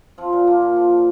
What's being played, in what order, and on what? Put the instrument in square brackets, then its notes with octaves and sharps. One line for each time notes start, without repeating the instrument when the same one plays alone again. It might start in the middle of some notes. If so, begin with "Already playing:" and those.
[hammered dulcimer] F3 C4
A#2
F3 A#3
A#2
F3
F3